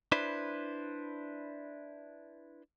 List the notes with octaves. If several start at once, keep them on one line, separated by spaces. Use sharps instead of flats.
D4 E4 B4 C5